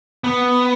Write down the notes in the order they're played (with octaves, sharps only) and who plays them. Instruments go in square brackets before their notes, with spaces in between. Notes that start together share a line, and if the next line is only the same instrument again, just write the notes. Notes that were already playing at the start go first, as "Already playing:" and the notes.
[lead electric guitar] B3